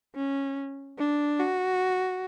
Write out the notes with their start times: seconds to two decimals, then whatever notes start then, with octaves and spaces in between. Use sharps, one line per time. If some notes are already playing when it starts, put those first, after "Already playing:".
0.16 C#4
0.99 D4
1.39 F#4